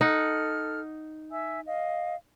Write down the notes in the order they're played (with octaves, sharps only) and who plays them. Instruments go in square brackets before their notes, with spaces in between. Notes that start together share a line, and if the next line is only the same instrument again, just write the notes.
[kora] D#4 F#5 [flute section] A4 F6
[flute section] E5 G#5 E6
D#5 F5